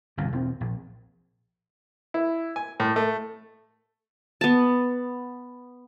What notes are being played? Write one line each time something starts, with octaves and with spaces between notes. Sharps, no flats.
G1 C2 B2
E1 C4
A#1
E4
G#5
A2
A3
B3 A5